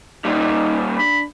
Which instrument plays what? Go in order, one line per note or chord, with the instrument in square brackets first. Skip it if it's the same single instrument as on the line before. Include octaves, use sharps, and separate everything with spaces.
[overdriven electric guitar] A#2 G3 [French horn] D#4
[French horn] D4 [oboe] B5